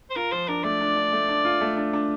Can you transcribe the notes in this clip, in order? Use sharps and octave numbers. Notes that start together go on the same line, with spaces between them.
C5
F4 A#4
F3 C5
D4 A#4
A3 D5
D4
D4
A3
D4
F4
A3
D4
D4